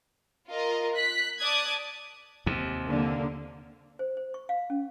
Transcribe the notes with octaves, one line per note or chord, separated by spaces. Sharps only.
F4 A#4 D#5
F#6 B6
D5 A5 D6 D#6 F#6 G#6
D#2 C3
D3 A#3
C5
C5
C#6
F5
C#4